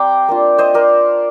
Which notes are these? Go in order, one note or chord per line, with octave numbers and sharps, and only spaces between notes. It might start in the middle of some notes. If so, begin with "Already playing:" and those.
Already playing: G3 C4 G5 A#5 C6 D6
A#3 D4 F4
C5 D#5
A#4 D5